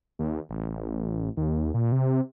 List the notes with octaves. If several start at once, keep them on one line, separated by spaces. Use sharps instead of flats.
D#2
A1
D#2
A#2
C3